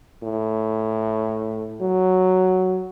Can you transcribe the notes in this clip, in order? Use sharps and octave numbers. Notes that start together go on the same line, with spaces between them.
A2
F#3